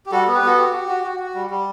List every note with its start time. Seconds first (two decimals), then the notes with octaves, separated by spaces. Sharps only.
0.06 G4
0.12 G3 F#4 A4
0.27 B3
0.35 G4 B4
0.42 B3 F#4 A4
0.58 F#4 G4
0.73 F#4
0.88 F#4
1.04 F#4
1.19 F#4
1.35 G3
1.50 G3